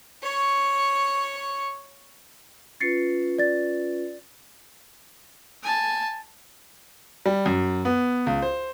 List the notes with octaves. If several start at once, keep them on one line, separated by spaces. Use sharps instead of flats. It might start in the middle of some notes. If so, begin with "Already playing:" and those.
C#5 C#6
C#4 F4 B4 A6 C7 C#7
D5 A6
G#5 A5
G3
F#2
B3
C#2
C5